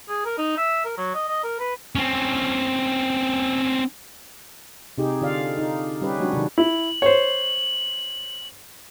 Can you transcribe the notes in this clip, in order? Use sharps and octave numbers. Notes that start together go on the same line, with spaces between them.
G#4
A#4
D#4
E5
A#4
F#3
D#5
D#5
A#4
B4
C4 C#4
C3 D#4 G4 G#4
D3 F4 D5 F5
D#4
G3 C#4 G4 B4
F#3 G#3 C4 D4 F#4
C3 D#3
E4 F#7
C5 C#5